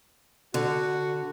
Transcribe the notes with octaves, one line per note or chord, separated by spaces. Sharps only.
D3 F#4